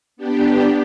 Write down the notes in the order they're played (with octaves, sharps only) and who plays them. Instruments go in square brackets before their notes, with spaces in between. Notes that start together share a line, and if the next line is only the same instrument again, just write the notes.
[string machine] B3 D4 G4